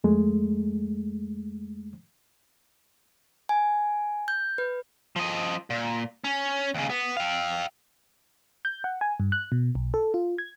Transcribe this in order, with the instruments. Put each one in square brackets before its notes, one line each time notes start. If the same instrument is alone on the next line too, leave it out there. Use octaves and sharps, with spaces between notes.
[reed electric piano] F2 G#3 A3
[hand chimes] G#5
G6
B4
[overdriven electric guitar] F3 D#5
A#2
C#4
D#2 C#3
B3
F5 G5
[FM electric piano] G6
F#5
G#5
G2
F#6
B2
B1
A4
F4
G#6